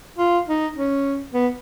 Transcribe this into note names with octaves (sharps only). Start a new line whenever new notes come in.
F4
D#4
C#4
B3